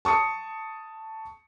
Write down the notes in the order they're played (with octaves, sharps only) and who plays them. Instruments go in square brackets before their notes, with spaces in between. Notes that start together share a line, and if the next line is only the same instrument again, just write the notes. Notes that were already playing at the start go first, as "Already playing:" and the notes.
[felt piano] A5 C#6 D#6 C#7